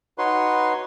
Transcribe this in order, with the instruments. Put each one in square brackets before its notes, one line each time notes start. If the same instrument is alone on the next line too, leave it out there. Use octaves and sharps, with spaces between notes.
[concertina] D#4 F#4 B4 C#5 C6